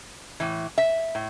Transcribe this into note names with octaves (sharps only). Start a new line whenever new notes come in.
A2 E3
E5
A2